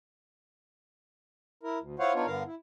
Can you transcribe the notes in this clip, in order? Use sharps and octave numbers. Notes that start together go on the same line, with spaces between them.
E4 A#4
D2
E4 F4 C5 C#5 F5 F#5
B3 D4 D#4 F4 C#5
G2 D3 B3 A#4 F5
E4